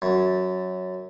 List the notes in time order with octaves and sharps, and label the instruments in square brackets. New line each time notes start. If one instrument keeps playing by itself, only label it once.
[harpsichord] F#2